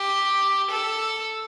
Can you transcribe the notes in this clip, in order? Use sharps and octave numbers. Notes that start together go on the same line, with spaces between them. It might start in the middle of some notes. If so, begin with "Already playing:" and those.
Already playing: G4
A4